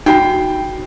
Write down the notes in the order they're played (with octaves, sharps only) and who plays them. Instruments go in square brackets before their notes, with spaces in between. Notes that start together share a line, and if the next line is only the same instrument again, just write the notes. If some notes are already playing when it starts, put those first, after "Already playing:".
[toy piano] D#4 F#4 B5 [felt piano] G5 C7